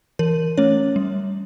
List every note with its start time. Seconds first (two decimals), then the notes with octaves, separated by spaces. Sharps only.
0.19 E3 A#4
0.57 A3 C#4 C#5
0.96 G3